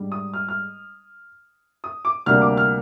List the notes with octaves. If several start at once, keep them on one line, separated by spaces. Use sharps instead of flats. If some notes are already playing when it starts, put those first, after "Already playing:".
Already playing: G#2 G3 D4
D#6
F6
F6
D#6
D6
D2 C3 G3 A#3 D4 F6
D6
F6